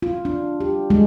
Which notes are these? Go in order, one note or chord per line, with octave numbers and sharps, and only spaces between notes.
F4
D4
G4
G#3